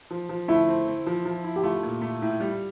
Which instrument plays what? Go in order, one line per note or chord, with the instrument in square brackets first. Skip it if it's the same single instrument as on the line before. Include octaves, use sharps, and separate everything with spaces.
[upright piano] F3
F3
[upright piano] A3 [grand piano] E4
[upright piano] C4
C4
F3
F3
E4
[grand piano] G4
[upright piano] A3 [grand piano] F4
[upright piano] A#2
A3
A2
G3